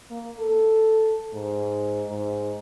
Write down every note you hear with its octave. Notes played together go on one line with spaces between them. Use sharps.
A#3
A4
G#2
G#2